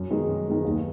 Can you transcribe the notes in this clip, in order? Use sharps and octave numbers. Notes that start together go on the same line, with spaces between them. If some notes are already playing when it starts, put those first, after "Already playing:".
Already playing: F#2
D#3 G#3 B3
F#2
D#3 G#3 B3
D#2